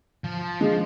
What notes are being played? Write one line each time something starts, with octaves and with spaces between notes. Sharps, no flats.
F3
G#3